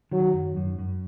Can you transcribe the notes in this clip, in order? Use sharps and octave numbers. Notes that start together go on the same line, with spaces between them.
D#3 F#3
F#2
F#2
F#2